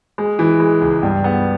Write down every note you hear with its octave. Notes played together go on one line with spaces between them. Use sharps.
G#3
E3
G#3
C#2
G2
B3